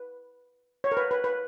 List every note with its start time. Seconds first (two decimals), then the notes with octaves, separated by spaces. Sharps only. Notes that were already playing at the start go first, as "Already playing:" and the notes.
Already playing: B4
0.84 C#5
0.92 A#4
0.97 B4
1.11 B4
1.24 B4